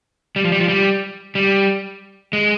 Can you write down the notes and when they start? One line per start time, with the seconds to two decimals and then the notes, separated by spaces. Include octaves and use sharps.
0.36 G3
0.44 F3
0.52 G3
0.60 F3
0.68 G3
1.35 G3
2.33 G#3